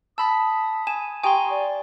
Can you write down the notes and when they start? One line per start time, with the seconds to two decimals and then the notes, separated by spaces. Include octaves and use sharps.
0.18 A5 B5 D#6 E6 B6
0.87 G#5 E7
1.24 G4 G5 G#5 A#5 C6 C#6 D#6
1.50 D5